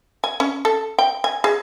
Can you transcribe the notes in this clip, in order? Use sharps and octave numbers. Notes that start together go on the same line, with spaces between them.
G#5
C#4
A4
G5
G#5
G#4